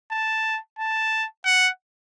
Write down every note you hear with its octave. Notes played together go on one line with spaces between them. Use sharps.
A5
A5
F#5